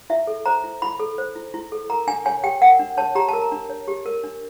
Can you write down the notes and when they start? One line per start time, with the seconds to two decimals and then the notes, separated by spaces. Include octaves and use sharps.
0.10 E4 E5
0.27 A4
0.46 C5 A#5
0.64 E4
0.82 E4 B5
1.00 A4
1.18 C5
1.36 E4
1.54 E4
1.72 A4
1.90 A#4 A#5
2.07 D4 G#5
2.25 C#5 G#5
2.43 G4 G5
2.61 A#4 F#5
2.79 D4
2.97 C#5 A5
3.15 G4 A#5
3.29 A#4 A5
3.42 A#5
3.52 D4
3.69 C#5
3.88 G4
4.06 A#4
4.24 D4